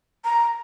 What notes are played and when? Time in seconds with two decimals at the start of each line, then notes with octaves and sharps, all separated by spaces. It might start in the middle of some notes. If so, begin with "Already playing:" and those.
0.25 A#5